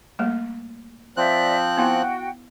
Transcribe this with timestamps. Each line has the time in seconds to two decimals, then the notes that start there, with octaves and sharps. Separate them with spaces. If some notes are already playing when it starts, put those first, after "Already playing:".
0.19 G3 A3 A#3
1.17 F3 C4 D5 E5 F#6
1.77 B3 E4 F#4 F5 G5